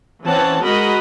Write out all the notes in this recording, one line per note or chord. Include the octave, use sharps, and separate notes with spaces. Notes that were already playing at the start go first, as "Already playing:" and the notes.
E3 C4 C#4 C#5 F#5 A5
G#3 F#4 A#4 D#5 F#5 B5